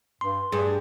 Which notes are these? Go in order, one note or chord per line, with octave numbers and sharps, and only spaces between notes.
G2 C6
G2 G#4